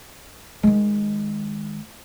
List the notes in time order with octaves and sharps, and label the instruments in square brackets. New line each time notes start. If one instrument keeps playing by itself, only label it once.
[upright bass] D#3 G#3